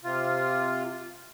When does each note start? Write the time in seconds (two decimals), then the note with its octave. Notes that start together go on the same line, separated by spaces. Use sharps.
0.04 C3 F4